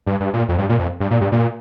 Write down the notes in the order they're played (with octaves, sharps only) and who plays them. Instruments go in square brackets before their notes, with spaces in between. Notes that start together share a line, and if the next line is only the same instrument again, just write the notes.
[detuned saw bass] G2
G2
A#2
F2
G2
A#2
F2
G2
A#2
G2
A#2